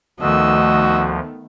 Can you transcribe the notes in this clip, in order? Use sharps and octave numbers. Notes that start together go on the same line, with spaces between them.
D2 D#3 F3 A3 B3 F#4 D#5 E6